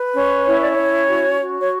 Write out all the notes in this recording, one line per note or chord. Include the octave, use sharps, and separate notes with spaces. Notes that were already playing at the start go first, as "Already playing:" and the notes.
Already playing: B4
C#4
E4 C#5
D5
C#4 C#5
F#4
F#4
C#5